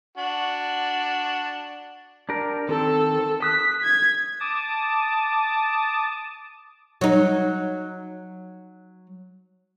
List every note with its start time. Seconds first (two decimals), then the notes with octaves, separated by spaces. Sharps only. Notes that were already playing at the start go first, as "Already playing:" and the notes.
0.18 D4 F#4
2.29 D4 G4 A#4
2.69 D#3 C4 A4
3.42 D#6 F#6 B6
3.83 G#6
4.40 A5 D6 D#6
7.01 F#3 D#4